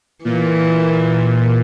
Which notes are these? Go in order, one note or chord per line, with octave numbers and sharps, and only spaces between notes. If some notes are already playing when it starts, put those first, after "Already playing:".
A#2 E3